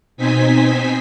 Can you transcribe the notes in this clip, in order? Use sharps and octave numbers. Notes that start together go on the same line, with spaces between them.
B2 C4 D#4 C5 G#5 B6